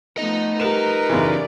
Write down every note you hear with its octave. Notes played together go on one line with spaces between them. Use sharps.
F3 A3 B3 D#4 D#5
G3 A#4 B4 E7
F#2 C#3 E3 C#4 G4 D5